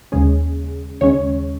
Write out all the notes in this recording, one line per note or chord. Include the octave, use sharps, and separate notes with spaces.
D#2 C#3 G#3 C#4 G#4
D#2 C#3 G#3 C#4 C#5